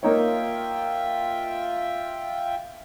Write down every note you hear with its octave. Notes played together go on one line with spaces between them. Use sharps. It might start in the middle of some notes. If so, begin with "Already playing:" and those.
A#3 D#4 F4 C#5 E5 G5